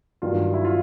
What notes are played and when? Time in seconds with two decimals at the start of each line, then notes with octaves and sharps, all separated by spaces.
0.22 G2 D#3 F#3 F4
0.54 E4
0.65 F4